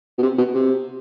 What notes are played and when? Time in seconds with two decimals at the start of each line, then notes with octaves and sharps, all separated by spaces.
0.18 B2
0.23 C3
0.38 B2
0.54 C3